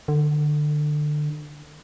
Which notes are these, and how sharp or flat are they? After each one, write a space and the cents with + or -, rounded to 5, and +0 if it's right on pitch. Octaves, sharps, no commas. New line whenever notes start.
D3 +25